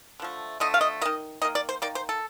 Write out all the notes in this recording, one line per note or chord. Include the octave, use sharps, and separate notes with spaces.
D3 F3 A3
D3 F3 A3 D#5
F5
D#5
D#3 A#3 D#5
D#3 A#3 D#5
D5
C5
D#3 A#3 D5
C5
A4